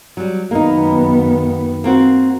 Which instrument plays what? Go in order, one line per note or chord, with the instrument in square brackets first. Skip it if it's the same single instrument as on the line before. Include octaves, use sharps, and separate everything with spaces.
[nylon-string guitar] F#3 G3
[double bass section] F#2 D#3 B3 [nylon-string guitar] A#3 D#4
[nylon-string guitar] A#3 C4 F#4